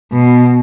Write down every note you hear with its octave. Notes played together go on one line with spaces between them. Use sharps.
B2